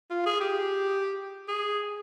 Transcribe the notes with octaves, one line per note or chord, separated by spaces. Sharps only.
F4
G#4
G4
G#4